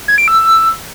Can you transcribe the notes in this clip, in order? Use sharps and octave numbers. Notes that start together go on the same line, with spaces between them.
G#6
D7
E6